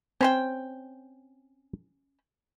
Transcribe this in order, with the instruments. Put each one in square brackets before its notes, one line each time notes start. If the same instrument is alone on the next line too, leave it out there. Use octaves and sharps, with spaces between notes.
[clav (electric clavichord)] C4 [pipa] C#4 C5 G5